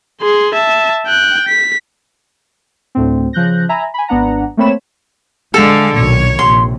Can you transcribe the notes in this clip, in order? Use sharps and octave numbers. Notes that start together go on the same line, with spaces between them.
G#4 C6
E5 A5
G5 F#6
B6
D2 A2 C4
C#3 F3 F#6 G6 A#6
E5 G#5 A#5 B5
G#5 B5
G#1 B3 D4 F#5 A#5
A3 A#3 C4 C#5 B5 E7
D3 G#3 A4 F5
B1 A#2 D#3 C#5
A#1 C3 C6